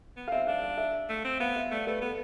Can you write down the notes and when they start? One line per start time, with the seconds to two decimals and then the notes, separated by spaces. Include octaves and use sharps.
0.17 B3
0.28 F5
0.32 C4 E5
0.47 D4 F5
0.63 F5
0.78 E5
1.09 A3
1.24 C4
1.40 B3 F5
1.56 E5
1.71 A3 D5
1.87 A3 B4
2.01 B3 A4